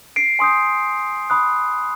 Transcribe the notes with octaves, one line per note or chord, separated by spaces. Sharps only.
C7 D7
G#5 C6 D#6 G6
B5 D#6 F#6